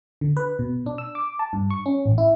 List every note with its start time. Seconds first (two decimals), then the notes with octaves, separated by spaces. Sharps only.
0.21 D3
0.37 B4
0.59 B2
0.86 D4
0.98 E6
1.15 D6
1.39 A5
1.53 G2
1.70 C#6
1.86 C#4
2.06 A1
2.18 E4